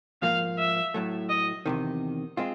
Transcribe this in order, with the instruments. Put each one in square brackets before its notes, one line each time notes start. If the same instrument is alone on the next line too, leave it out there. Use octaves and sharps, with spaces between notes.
[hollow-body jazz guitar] G#2 F3 A#3 [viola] F5
[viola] E5
[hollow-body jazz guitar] A2 F#3 A3
[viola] D#5
[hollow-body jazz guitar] E2 C3 D#3
G#3 C4 F4